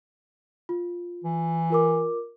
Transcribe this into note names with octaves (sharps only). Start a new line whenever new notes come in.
F4
E3
F4 A#4 D6